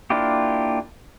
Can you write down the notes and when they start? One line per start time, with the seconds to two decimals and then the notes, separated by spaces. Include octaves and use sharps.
0.10 A#3 D4 E4 F4 G4